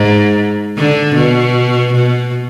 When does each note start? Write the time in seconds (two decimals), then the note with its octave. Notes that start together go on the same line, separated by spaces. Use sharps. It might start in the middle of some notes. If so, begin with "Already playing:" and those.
Already playing: G#2
0.78 D3
1.16 B2
1.94 B2